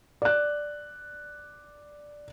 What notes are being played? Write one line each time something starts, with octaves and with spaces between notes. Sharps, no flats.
D5 F#6